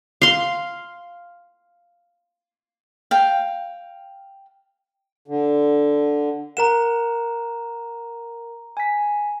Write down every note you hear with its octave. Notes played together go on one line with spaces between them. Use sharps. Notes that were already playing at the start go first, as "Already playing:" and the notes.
F5 C6
F5 G5
D3
A#4 F#5 A#5 E7
G#5 B6